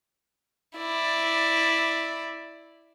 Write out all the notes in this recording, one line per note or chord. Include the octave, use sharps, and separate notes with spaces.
E4 D5